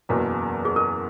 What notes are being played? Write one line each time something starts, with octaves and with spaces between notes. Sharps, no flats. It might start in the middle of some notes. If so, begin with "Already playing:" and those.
F#1 E2 B2 A#3
G#4
A#4